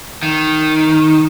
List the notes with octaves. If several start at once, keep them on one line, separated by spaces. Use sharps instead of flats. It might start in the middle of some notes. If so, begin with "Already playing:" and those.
D#3